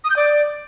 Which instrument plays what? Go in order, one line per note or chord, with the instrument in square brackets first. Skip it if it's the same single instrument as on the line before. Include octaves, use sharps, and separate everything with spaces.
[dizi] D#6
G6
D5